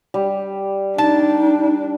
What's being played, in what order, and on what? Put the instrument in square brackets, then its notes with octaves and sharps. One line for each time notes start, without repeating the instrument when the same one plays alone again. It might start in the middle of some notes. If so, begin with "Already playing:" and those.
[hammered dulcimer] G3
[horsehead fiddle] D4 [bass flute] D#4 [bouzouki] A5